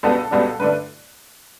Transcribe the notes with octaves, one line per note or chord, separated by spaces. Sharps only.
C#2 B2 G3 B3 D4 A4
C#2 B2 G3 B3 D4
G2 D3 A3 D4 B4